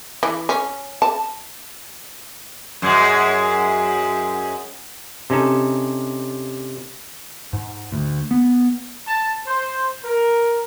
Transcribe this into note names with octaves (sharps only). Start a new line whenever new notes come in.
E3
C#4
A5
F#2 G#3
C3 C#4 D#4 A4
G#2
D2
B3
A5
C5
A#4